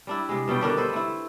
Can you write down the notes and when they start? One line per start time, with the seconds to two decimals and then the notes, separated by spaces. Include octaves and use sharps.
0.07 G3 D4 E4
0.29 C3 G#3
0.48 G2 B2 G3 G5
0.61 D3 D#3 D4 G4
0.77 D4 A4 B4 C5
0.93 A3 E4